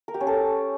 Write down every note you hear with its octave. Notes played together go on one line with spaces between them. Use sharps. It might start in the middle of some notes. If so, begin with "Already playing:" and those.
A#4
G4
C#4
A4